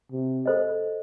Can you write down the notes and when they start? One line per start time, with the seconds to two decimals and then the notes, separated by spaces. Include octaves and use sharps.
0.12 C3
0.46 A4 C5 D#5